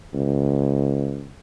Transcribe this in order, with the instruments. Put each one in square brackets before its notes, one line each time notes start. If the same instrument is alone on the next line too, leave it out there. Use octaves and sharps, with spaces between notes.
[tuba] C#2